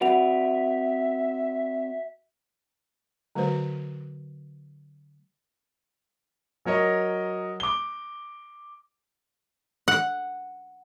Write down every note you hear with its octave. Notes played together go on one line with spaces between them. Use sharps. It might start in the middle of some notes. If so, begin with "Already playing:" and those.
C4 F#4 B4 D5 E5 F#5 F7
D3 F#3 A3 F#4 B4 C5
F#3 A#4 C#5 D#5
D6 G7
F#5